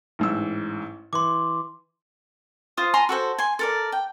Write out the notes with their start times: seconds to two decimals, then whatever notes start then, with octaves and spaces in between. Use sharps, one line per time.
0.19 A1 G#2 E6
1.13 E3 C6 D6
2.77 F4 C5 D#6
2.94 G#5 A#5 C6
3.09 F#4 A4 C5
3.38 G#5 C6
3.59 A4 A#4 D5
3.92 G5